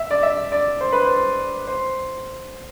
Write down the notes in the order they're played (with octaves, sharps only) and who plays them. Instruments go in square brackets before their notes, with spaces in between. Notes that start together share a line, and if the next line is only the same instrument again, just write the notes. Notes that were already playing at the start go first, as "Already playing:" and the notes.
Already playing: [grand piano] E5
D5
E5
D5
C5
B4
C5
C5